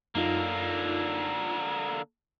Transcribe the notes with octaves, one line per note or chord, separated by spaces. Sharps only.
F#2 D3 A#3 D#4 F4